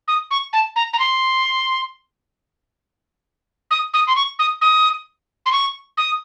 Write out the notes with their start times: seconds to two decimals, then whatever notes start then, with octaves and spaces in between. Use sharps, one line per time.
0.08 D#6
0.31 C#6
0.53 A5
0.76 A#5
0.93 A#5
0.99 C6
3.71 D#6
3.94 D#6
4.07 C6
4.16 C#6
4.39 D#6
4.62 D#6
5.46 C6
5.52 C#6
5.98 D#6